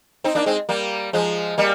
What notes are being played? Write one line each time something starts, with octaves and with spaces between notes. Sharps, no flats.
C4 D#4
A#3 D4
G#3 C4
G3 A#3
F3 G#3
G3 A#3